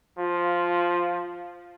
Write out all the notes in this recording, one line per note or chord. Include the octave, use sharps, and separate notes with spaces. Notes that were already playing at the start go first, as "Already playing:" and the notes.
F3 F4